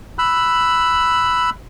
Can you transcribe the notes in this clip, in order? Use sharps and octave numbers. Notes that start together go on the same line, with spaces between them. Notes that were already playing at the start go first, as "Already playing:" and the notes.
B5 E6 F#6